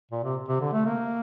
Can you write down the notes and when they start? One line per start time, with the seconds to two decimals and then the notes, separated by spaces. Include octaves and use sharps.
0.12 A#2
0.24 C3
0.48 C3
0.61 D3
0.73 A3
0.85 A#3